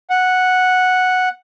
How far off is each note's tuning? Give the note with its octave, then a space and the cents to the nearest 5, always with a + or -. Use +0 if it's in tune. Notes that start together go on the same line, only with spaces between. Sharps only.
F#5 -5